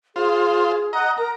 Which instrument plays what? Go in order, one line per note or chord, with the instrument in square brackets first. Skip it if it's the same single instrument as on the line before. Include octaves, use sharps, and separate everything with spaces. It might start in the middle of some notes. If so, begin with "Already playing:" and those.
[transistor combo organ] F4 C5 [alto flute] G#4
[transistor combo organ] D#5 A#5 [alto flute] F#5
[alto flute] A#4 [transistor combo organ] A#5